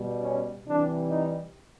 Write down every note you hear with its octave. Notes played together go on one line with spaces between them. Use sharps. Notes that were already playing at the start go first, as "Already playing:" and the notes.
Already playing: B2 G3
C#4
C3 E3 G3 D4
D#4